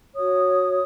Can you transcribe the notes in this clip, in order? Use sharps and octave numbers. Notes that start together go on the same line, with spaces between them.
F#4 C#5 D#6